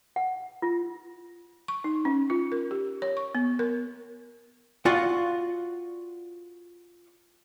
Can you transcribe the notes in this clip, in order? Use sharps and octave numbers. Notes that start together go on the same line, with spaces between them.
F#5
F4
C#6
D#4
C#4
F4
A#4
G4
C#5
C#6
B3
A#4
F4 F#4 D5 F5 F#5